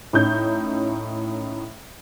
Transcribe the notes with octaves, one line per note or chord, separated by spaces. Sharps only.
A2 C#4 D#4 G6